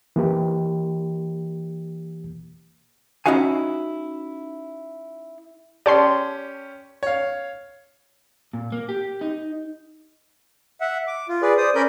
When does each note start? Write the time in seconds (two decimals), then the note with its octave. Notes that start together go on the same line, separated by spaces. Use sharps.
0.16 E3 A#3 G4
3.26 C#4 D#4 E4 F#4 F5 G#5
5.86 C#4 G4 D5 A5 C6
7.03 C#5 F5
8.53 A#2
8.72 A#3
8.89 G4
9.21 D#4
10.81 E5 F#5
11.07 D6
11.29 F4
11.42 G#4 B4 D5
11.57 C5 D5 D#6
11.75 C#4 A#4 D5 B5 G6